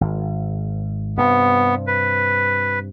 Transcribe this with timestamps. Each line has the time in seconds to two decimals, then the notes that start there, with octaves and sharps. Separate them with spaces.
0.01 G#1
1.18 G2 C3 B3
1.87 B4